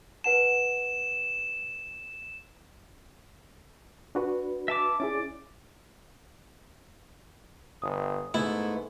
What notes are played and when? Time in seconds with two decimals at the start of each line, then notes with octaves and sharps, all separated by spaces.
0.24 B4 F#5 A5 E7
4.15 D4 F#4 B4
4.68 E5 A5 D6
5.00 C#4 E4 G#4 D5
7.82 G1 D#6
8.34 G#2 A3 B3 E4